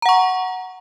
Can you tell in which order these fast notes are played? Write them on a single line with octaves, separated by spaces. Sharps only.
A#5 F#5 C#6